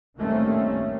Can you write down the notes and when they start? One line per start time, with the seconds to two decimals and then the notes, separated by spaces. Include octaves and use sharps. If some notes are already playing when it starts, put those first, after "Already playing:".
0.18 D#3 G3 A3 A#3 C4 C#4